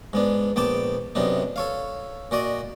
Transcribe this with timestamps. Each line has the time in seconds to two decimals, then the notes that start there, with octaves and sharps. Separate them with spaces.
0.13 G#2 B3 D4
0.56 A#1 B3 G5 A5 D6
1.15 F#2 C3 B3 D4 D#4
1.56 A4 C#5 F5
2.31 A#2 F#4 D5 D#5